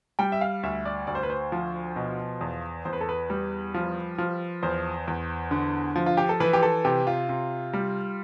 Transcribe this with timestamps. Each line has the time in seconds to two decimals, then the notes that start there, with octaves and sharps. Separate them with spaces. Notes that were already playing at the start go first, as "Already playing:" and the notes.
0.19 G3 G5
0.32 E5
0.41 F5
0.63 D2 E5
0.85 D5
1.07 D2 D5
1.15 C5
1.23 B4
1.30 C5
1.52 F3
1.96 B2
2.41 E2
2.85 E2 C5
2.93 B4
3.01 A4
3.09 B4
3.30 G3
3.74 F3
4.18 F3
4.63 E2 C5
5.07 E2
5.51 D3
5.96 F3
6.06 F4
6.17 G4
6.29 A4
6.40 E3 B4
6.53 G4
6.63 A4
6.85 C3 G4
7.07 F4
7.29 C3
7.73 G3